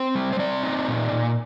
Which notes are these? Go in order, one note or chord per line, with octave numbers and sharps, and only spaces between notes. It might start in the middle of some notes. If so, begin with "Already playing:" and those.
Already playing: C4 C5
G3
C5
C4 D5
D#4
A#2
A#2